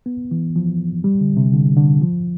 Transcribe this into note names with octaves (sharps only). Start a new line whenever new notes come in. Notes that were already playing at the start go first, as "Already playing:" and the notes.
B3
E3
F3
G3
D3
C3
D3
D3
F3